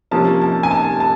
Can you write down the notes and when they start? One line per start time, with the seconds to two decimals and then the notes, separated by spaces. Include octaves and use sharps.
0.11 C3 F3 A#3 C#4 A5
0.42 A5
0.63 G#5
0.71 A5
1.00 A5